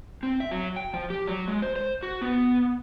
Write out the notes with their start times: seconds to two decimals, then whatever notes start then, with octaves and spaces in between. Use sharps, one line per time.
0.23 C4
0.40 E5
0.51 F#3
0.76 G5
0.93 F3
1.10 G4
1.27 F#3
1.48 G#3
1.62 C5
1.76 C5
2.03 F#4
2.21 B3